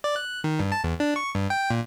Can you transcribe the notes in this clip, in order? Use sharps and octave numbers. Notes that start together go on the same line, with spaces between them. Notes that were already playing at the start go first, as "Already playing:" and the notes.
D5
F#6
D#3
G2
A5
E2
D4
C#6
G2
G5
A#2